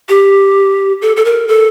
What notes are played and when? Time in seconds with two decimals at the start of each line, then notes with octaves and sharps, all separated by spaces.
0.09 G4
1.02 A4
1.16 A4
1.25 A#4
1.48 A4